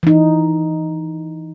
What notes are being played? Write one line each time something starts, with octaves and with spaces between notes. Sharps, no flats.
E3 D#4